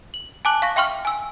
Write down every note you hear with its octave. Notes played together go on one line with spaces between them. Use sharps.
F#7
G#5 A5 D6 F#6 F#7
F5 C#6 A#6
E5 G5 C6 C#6 F6
G#5 E6